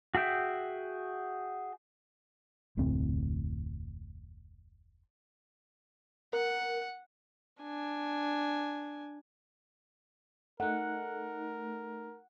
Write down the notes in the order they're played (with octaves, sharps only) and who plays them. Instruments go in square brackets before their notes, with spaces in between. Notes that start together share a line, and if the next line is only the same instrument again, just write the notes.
[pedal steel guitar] F#4 G#4 E5 G5
[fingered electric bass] F1 D2 A2 C4
[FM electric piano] A#4 [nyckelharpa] F#5
[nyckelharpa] D4 G#5
[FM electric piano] A3 D#4 [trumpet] A#4 [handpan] F#5